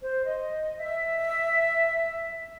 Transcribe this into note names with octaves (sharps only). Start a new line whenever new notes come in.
C5
D#5
E5